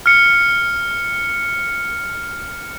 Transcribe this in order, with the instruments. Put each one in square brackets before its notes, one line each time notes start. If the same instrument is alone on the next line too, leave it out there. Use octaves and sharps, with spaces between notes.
[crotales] F6 C#7